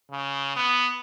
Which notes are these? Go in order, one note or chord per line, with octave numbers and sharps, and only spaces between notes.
C#3
B3